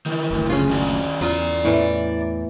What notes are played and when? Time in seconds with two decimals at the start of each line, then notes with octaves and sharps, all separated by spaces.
0.06 D#3 E3
0.31 F#1 D2
0.50 C#3 C#4 F4
0.69 D#3 F#4
1.21 E2 F4 D5 F5 A#5
1.65 A2 E3